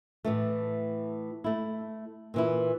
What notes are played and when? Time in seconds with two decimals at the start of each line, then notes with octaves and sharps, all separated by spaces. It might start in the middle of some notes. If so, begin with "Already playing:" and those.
0.25 A2 E3 A3
1.44 A3 E4
2.34 A#2 E3 E4